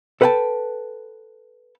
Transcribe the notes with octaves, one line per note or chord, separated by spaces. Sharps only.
A4 B4 C5 F#5 G5 A5